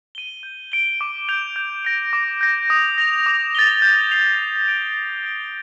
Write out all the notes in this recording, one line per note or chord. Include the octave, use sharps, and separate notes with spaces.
D#7 G7
G6
D7 G7
D6
G6 D7 F7
G6
A#6 D7
D6
G6 A#6
D#6
A#6 F7
D6
A6 D#7 G7
G6
C7 F7
A6
D7 G7
A6
D7 G7